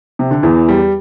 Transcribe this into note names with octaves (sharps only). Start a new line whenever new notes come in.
C3
D3
E2 E3
G3